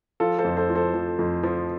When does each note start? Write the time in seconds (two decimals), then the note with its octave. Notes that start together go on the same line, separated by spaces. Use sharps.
0.20 F3 F4 A4
0.39 A4 C5
0.44 F2
0.57 A4 C5
0.70 F3
0.75 A4 C5
0.94 F3
1.19 F2
1.43 F3